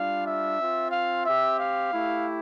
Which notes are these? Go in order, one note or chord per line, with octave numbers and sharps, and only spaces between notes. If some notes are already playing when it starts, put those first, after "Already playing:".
Already playing: G3 D4 F4 F5
E5
C4 F4
F5
C4 G4 E5
F5
A3 E4 G4